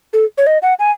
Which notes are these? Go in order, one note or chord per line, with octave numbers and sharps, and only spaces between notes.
A4
C#5
D#5
F#5
G#5